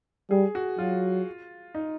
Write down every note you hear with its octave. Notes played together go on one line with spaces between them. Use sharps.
G3 G#4
F#4
F#3 F4
D#4